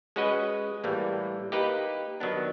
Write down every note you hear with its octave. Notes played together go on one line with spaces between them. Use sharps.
G#3 C#4 F#4 B4 D#5
A2 E3 G3 A#3
A#3 D#4 G4 B4
D#3 F#3 B3 D4